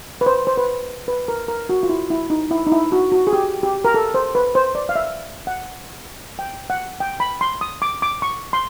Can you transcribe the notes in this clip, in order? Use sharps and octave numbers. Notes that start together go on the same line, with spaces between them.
B4
C5
C5
B4
B4
A#4
A#4
F#4
F4
E4
E4
D#4
E4
D#4
E4
F#4
F#4
G#4
G4
G4
A#4
A4
C5
B4
C5
D5
F5
E5
F#5
G5
F#5
G5
B5
C6
D#6
D6
D6
C#6
C6